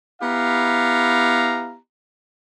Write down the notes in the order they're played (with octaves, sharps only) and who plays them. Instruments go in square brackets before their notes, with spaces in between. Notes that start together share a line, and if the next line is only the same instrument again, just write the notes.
[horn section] B3 E4 G4 F5 A#5